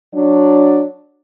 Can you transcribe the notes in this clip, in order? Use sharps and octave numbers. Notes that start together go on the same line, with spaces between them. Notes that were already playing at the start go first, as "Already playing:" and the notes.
F#3 D4